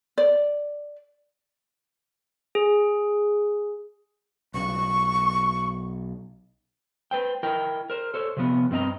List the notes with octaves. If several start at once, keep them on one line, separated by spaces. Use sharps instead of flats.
D5
G#4
B1 C#3 C#6
B4 C5 G5
E4 A#4 D#5 G5
A#4 C5
A4 C5 C#5
C3 F3 B3
G2 C4 D#5 A#5